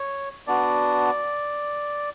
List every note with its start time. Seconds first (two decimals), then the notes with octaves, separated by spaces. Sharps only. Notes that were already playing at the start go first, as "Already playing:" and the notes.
Already playing: C#5
0.47 B3 D4 F#4 D5